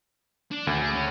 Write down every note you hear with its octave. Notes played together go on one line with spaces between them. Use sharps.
D4
D2 D#3 G#4
G#4
C#4